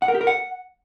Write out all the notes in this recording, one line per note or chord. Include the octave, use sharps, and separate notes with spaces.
F#5
A#4
G4
A#4
F#5